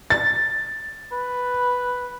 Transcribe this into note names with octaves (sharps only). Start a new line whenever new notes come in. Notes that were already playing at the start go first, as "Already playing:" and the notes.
A6
B4